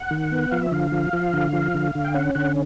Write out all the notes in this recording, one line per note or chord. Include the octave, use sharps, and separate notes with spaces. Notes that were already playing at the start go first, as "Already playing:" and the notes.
Already playing: F#5
D#3
B3
F3 F5
E5
D3 F5
F3
F3
D3
F3
D3
D3
G5
C#4 F#5
D3 F#5